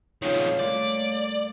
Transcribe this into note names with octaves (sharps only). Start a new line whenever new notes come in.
F#2 D#3 F3 G#3 C4 C#5 F5
G2 A3 A#3 D5